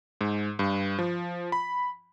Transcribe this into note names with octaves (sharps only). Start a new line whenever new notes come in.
G#2
G2
F3
B5